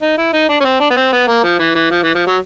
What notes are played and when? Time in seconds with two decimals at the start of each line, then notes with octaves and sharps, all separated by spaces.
0.02 D#4
0.18 E4
0.33 D#4
0.49 D4
0.60 C#4
0.65 C4
0.80 D4
0.91 B3
0.97 C4
1.12 B3
1.28 A#3
1.44 F3
1.59 E3
1.75 E3
1.91 F3
2.03 E3
2.15 F3
2.27 F#3